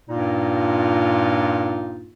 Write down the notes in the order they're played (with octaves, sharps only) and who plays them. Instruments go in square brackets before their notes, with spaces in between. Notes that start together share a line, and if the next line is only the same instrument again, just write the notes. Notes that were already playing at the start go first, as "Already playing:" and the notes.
[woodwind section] G2 A#2 A#3 D#4 F4